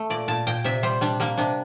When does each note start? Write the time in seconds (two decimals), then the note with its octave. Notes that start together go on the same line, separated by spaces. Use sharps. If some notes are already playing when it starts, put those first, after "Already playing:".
Already playing: A3
0.10 A#2 D5
0.28 A#2 A5
0.47 A#2 G5
0.64 C3 E5
0.83 G3 C5
1.01 G3 D4
1.20 G3 A#3
1.38 C3 D4